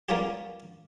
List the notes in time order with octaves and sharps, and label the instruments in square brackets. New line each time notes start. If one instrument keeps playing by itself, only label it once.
[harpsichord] G3 A#3 B3 C#4 F4 G4